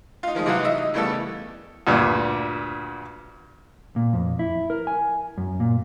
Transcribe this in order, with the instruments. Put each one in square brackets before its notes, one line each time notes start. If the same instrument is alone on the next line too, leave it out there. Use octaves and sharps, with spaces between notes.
[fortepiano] D#4 F4
D#3 F3 G#3 D#4
C3 E3 F#3 D#4 F4 F#4
D#5 E5 D#6
D#4
C#3 E3 G3 A3 B3 A4
D2 G2 A#2
[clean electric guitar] A#2
F2
E4
A#4
G#5
F#2
A#2